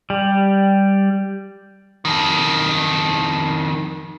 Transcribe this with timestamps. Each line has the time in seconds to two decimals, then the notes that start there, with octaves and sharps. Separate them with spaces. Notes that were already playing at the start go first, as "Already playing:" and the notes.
0.10 G3
2.05 F2 D#3